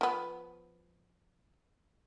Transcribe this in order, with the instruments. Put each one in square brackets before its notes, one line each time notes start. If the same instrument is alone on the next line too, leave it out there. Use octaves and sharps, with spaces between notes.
[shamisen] F3 B3